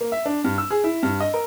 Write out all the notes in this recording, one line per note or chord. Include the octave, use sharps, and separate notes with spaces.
A#3
E5
D4
G2
E6
G#4
E4
G2
D#5
A#4